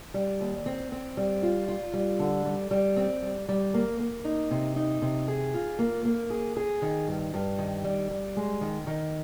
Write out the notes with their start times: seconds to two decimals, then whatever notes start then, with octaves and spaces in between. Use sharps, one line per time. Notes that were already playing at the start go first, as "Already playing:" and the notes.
0.14 G3
0.41 D#2
0.66 C4
0.92 C4
1.17 G3
1.43 F4
1.68 F4
1.93 G3
2.19 D3
2.46 G3
2.71 G3
2.97 C4
3.22 G3
3.49 G3
3.74 A#3
4.00 A#3
4.25 D#4
4.51 C3
4.76 D#4
5.02 C3
5.28 G#4
5.54 F4
5.79 A#3
6.05 A#3
6.30 G#4
6.57 G#4
6.82 D#3
7.08 G2
7.34 G2
7.58 D#3
7.84 G3
8.11 G3
8.37 G#3
8.61 D#3
8.87 D#3